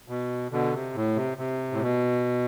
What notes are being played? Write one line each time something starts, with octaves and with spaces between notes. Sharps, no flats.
B2
B2 D3
C3
A2
C3
C3
A2
B2